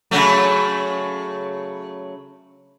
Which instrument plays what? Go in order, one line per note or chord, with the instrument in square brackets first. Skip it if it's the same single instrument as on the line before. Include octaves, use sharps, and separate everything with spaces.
[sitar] C#3 F#3 A3